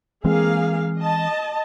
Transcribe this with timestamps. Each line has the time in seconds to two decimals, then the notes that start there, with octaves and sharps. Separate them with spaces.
0.25 E3 G#3 A#3 C4 G#4 F5
0.97 D#5 A5